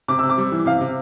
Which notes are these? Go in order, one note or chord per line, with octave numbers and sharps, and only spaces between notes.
C3 D6
C3 E6
D6
G3
E3
C3 F5
C3